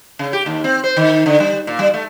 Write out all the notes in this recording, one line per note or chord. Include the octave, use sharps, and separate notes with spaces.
C#3
G4
D#2
C4
C5
D#3
D3
G3
A#2
G3
A3